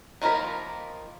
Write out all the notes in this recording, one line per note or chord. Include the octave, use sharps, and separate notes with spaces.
D#3 F3 A#3 A#4 B5